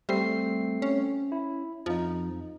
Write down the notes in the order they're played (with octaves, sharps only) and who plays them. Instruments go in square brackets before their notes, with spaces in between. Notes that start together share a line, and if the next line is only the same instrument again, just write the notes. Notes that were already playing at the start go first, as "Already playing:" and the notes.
[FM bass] G3 [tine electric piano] A3 C4 C7
[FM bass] C#4
[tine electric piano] E4
[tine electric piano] F2 D#4 [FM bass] F3